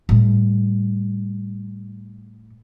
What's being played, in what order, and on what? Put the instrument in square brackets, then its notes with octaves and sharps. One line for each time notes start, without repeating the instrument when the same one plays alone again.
[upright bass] A2 G3